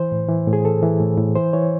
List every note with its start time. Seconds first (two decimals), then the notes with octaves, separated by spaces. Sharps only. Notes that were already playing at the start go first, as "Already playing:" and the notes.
Already playing: E3 C5
0.12 A2
0.29 E3
0.47 A2
0.53 G#4
0.65 E3 A4
0.83 E3
1.00 A2
1.18 A2
1.36 E3 C5
1.53 E3 C#5